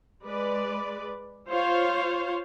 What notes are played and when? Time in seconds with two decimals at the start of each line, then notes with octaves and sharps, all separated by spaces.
0.24 G#3 B4 D5
1.49 F4 C5 C#5 F5